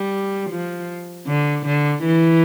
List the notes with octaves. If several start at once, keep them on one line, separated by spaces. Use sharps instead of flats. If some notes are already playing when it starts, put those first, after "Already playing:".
Already playing: G3
F3
D3
D3
E3